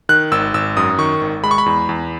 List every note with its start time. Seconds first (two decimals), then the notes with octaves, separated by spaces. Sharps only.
0.09 D#3 F#6
0.32 G#1 E6
0.54 G#1 E6
0.77 F#2 D#6
0.98 D#3 C#6
1.21 G#1
1.44 G#3 B5
1.51 C#6
1.58 B5
1.66 E2
1.89 E2